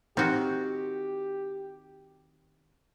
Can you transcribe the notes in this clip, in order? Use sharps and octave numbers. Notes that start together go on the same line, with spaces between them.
D#3 C4 F#4 G4